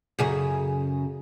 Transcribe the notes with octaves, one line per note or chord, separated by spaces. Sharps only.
F#2 C#3 G#4